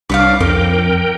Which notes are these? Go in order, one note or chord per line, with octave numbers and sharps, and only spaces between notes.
C2 D4 B4 C#5 F5 D6
F2 A#4 G5 D6